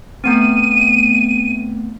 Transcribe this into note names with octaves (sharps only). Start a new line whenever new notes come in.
A3 B3 C4 D#7